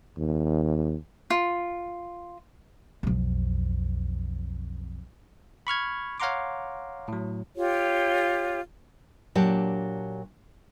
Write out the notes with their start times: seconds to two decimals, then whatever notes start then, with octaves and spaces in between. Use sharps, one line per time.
0.18 D#2
1.30 F4
3.03 B1 F2
5.67 B5 C#6 F6 G#6
6.20 C#5 F5 F#5 A#5 C6 D6
7.08 A2 F#3
7.54 F4 G4 C#5
9.35 A#2 F#3 D4 G4 A5